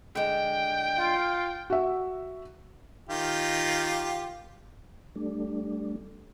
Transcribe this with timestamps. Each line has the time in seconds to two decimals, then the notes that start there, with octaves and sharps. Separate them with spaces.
0.15 D3 G#3 G5
0.97 F4
1.70 F#4 E5
3.09 D#3 F4 G4
5.15 G3 A3 D4